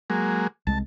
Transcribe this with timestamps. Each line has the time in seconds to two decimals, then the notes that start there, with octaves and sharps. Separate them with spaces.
0.10 F#3 G#3 A#3
0.67 C2 G#3 A5